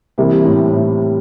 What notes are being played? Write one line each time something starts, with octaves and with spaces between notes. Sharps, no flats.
C3 E3 G3 A#3 E4
A2
A2